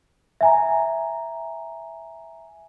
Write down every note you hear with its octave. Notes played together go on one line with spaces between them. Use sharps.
E5 G#5 A#5